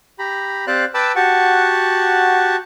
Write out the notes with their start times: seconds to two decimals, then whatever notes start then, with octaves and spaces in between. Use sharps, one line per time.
0.19 G4 A#5 B5
0.67 C4 G4 C5 D5 F5 F#6
0.94 B4 G5 A5 B5 D6 E6
1.16 F#4 G4 F#5 A5 C#6